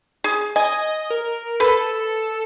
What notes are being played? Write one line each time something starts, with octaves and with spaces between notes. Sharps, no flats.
G#4
D#5 G#5
A#4
A4 B4